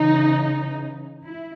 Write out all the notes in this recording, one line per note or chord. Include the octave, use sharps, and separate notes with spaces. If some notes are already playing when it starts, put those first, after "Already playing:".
Already playing: C#3 E3 D#4
E4